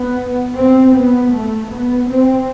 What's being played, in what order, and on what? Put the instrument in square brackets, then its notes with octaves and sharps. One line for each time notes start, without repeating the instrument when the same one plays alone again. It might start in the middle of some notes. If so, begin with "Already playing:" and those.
Already playing: [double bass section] B3
C4
B3
A3
B3
C4